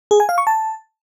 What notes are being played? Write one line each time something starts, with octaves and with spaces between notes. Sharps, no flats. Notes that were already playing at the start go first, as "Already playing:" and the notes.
G#4
G#5
F5
C#6
A5